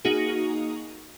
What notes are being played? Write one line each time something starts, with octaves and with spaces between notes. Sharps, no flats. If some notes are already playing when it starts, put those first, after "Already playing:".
A#3 D#4 F#4 G#4